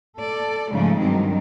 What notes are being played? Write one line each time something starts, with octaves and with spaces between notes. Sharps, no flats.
A4 D5
G#2 C#3 F3 G#3 A3
G2 D#3 F#3 C4